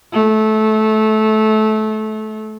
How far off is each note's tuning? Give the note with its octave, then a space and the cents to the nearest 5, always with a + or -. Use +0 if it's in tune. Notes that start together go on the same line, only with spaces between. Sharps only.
A3 -20